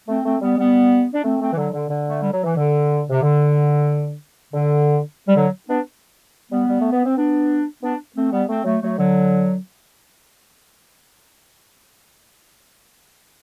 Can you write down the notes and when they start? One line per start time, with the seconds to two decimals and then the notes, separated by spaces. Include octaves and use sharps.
0.09 A3 C4
0.25 A3 C4
0.42 G3 B3
0.58 G3 B3
1.13 D4
1.24 A3 C4
1.41 A3 C4
1.52 E3
1.57 D3 F#3
1.74 D3
1.90 D3
2.08 A3
2.20 G3
2.32 F#3
2.43 E3
2.56 D3
3.10 C3
3.22 D3
4.53 D3
5.27 G3
5.36 D3 F#3
5.68 B3 D4
6.51 G3 B3
6.68 G3
6.81 A3
6.92 B3
7.05 C4
7.17 B3 D4
7.82 B3 D4
8.16 A3 C4
8.32 G3 B3
8.49 A3 C4
8.65 F#3 A3
8.82 F#3 A3
8.98 D3 F#3